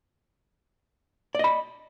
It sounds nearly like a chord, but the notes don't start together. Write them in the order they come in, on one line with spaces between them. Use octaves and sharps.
D5 D#5 B5